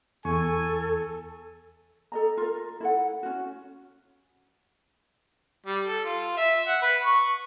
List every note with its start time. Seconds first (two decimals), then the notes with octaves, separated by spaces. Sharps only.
0.25 E2 A4 G#5 C#6
2.12 A4 D#5 A#5
2.37 F4 A#4
2.80 E4 A4 F#5
3.23 C#4 F#4
5.66 G3
5.86 A4
6.05 F4
6.37 E5
6.67 F#5
6.82 B4
7.04 C#6